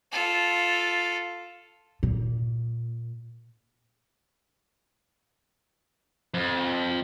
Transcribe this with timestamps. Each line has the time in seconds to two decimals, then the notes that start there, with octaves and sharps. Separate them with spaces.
0.12 F4 A4
2.03 A#2
6.34 F2